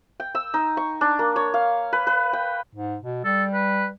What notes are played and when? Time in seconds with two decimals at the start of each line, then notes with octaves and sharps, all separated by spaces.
0.20 G5
0.35 E6
0.54 D#4
0.77 C#6
1.01 D4
1.19 A#3
1.36 C#5
1.54 F5
1.93 B4
2.07 B4
2.33 G5
2.75 G#2
3.02 B2
3.25 G3 A4
3.54 B4